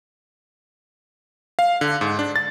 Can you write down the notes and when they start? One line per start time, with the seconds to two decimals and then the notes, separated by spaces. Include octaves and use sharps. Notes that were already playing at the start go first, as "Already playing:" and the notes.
1.59 F5
1.81 D3
2.01 G#2
2.19 D4
2.36 A6